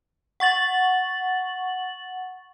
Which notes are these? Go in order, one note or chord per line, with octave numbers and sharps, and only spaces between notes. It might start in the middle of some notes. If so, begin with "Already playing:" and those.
F#5 C#6 A6 F#7